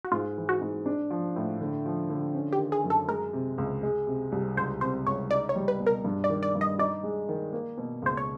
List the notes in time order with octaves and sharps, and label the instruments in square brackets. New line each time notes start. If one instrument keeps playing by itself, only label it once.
[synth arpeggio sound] F#4
[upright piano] G#2 [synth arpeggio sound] F4
[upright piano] E3
[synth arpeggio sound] F#4
[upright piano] G#2
D4
F3
A2
D3
F3
D3
C#4
[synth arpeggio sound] G4
[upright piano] D#3
[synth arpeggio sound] G#4
[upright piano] F#2
[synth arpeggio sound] A4
[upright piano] G#3 [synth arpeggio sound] A#4
[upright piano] C3
C#2
G#3
C3
C2
[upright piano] C#2 [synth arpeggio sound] C5
[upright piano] C3 [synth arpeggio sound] C5
[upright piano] C#2 [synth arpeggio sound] C#5
[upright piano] D#4 [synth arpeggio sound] D5
[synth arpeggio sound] C#5
[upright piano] G3
[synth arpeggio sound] B4
[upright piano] B2
[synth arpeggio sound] A#4
[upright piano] G2
[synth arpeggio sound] D5
[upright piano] D#3
[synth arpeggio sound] D5
[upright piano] G2
[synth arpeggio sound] D#5
[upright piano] D#4 [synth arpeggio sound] D5
[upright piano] G#3
D#3
A#3
B2
[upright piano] C#2 [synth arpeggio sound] C5
[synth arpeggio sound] C#5